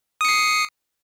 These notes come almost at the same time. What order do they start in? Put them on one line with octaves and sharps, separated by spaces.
D#6 C#7 C7